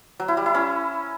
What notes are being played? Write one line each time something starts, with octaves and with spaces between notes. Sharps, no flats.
F#3
E4
G3
E4
C#4